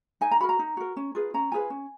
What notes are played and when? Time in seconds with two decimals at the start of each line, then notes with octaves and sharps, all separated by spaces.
0.21 D#4 G#5
0.31 A#5
0.40 F#4 A#4 B5
0.49 A#5
0.59 D#4
0.77 F#4 A#4
0.97 C#4
1.15 F4 G#4 B4
1.34 C#4 A#5
1.52 F4 G#4 B4 G#5
1.70 C#4